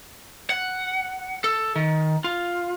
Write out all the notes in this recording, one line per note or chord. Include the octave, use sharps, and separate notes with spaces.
F#5
A4
D#3
F4